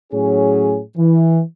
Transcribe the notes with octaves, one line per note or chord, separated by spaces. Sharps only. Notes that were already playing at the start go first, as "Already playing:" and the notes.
A2 F#3 C#4 G#4
E3